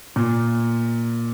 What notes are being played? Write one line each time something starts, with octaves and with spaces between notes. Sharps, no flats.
A#2